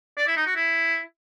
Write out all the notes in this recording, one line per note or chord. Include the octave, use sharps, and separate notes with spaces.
D5
E4
D#4
F#4
E4